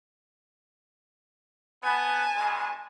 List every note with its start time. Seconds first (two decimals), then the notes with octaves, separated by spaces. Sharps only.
1.84 B3 G#5 A5
2.36 G2 B2 G#3